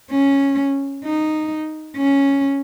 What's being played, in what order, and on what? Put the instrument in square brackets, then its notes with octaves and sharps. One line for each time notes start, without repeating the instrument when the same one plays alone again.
[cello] C#4
D#4
C#4